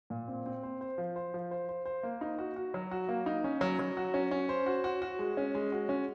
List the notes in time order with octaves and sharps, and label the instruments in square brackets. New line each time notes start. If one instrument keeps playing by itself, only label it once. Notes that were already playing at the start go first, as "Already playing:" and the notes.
[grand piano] A#2
C4
C4
C5
C5
F3
C5
F3
C5
C5
C5
A#3
D#4
F#4
F#4
F#3
F#4
A#3
D#4
C#4
F#3
F#3
F#4
C#4
C#4
C5
F#4
F#4
F#4
G#3
C#4
G#3
F#4
C#4